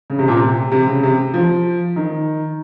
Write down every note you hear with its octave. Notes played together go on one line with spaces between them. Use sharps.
C#3
C3
A#2
C3
C3
C#3
C3
F3
D#3